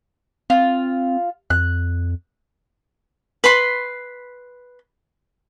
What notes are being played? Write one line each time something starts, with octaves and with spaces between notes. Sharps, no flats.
C4 F4
F2 F#6
B4 B5 C6